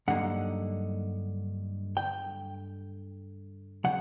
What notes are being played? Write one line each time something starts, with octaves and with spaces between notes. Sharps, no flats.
G2 D3 F#3 A#3 D#4 F#5
G5
C#3 F#3 F#5